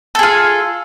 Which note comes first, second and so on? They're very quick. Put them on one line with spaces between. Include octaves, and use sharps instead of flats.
A4 G#4 F4